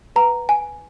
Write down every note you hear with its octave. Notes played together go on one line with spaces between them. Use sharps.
B4 F#5 A#5
G#5